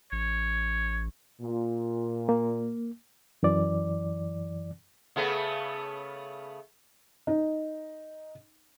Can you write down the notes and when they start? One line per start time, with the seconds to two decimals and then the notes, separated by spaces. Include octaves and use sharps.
0.12 A1 C#5
1.41 A#2
2.29 A#3
3.43 F#2 E3 D5
5.16 C#3 A3 B3
7.27 D#4